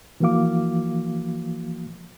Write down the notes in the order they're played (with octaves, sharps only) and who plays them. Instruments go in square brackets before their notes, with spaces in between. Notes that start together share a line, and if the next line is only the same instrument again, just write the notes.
[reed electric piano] E3 F3 A#3 F#4 F5 D6